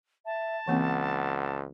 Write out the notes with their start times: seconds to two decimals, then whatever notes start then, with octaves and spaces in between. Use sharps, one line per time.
0.26 E5 A5
0.68 C#2 E3 A#3 C4 F#5